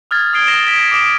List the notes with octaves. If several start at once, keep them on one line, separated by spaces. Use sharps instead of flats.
D#6 F6 G#6 A6
D#6 G#6 C7 D7 G7
D#6 A#6 C7 E7 G7
D#6 A6 B6 D7 E7
G#6 A#6
D6 D#6 D7 G7